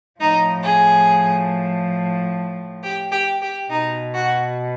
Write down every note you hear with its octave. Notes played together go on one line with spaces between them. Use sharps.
A2 F3 D#4
G#4
G4
G4
G4
B2 D#4
F#4